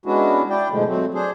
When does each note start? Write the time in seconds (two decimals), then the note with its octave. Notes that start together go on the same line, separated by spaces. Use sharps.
0.06 G#3 B3 C#4 D4 E4 F#4
0.50 D4 E4 D5 G5
0.71 G#2 B2 D3 F3 G#3 A3
0.87 F#3 A3 C4
1.14 D4 G#4 C5